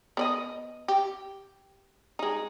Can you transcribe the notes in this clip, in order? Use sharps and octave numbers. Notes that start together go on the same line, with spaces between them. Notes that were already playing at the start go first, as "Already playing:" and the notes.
B3 D5 D#5
G4
G#3 D#4